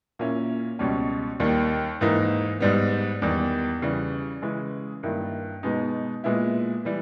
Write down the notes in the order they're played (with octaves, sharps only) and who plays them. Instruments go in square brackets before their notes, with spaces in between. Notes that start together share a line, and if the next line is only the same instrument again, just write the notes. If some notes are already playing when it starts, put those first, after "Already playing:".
[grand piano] A#2 A#3 C#4 E4
C#2 B2 G3 C#4
D#2 D#3 G3 A#3
G#2 E3 A#3 D#4
G#2 G3 B3
E2 D#3 G3
C#3 E3 G3
C#3 E3 G#3
G2 D#3 A#3 E4
B2 G#3 B3 D#4
A#2 G#3 B3 E4
E3 G3